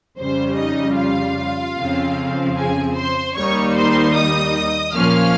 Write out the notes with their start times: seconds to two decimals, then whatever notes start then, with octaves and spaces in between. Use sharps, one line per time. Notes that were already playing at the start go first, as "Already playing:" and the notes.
0.18 F2 C#3 G3 C5
0.57 D#4 D#5
0.97 F4 F5
1.77 F2 C#3 F3 C4
2.56 G#4 G#5
2.96 C5 C6
3.36 D#2 D#3 G3 A#3 D#4 C#5 C#6
3.76 C5 C6
4.15 D#5 D#6
4.95 A#2 F3 A#3 C#4 F5 F6